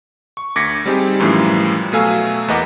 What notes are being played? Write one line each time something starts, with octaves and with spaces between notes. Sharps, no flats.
C#6
D2 D6 G#6 A#6 B6 C#7
G3 C4 D#4 G4 G#4
F#2 A2 E3 F3 G3
B2 F#3 A3 F5 G#5 E6
E2 A#3 B4 D#5 F#5 D6